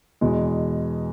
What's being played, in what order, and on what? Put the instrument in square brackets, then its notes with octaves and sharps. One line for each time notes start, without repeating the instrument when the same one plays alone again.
[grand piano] E2 B2 G#3